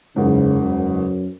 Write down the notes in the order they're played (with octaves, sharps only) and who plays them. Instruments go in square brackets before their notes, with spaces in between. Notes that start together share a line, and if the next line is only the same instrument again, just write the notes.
[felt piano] F#1 E2 G#2 [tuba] C#3
[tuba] F#2